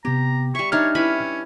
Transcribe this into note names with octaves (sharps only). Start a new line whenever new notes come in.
C3 B3 G4 A#5
G3 E5 C#6
D4 D#4 C#5 E5 F6
C#4 E4 B4 B5